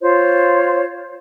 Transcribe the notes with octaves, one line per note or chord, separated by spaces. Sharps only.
F4 C5 C#5